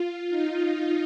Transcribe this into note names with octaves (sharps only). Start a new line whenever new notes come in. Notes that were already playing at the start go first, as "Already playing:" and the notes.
Already playing: F4
D#4